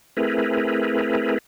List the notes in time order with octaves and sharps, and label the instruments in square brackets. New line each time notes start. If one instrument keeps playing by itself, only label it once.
[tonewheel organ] A3 C4 E4 G#4 A#4 B4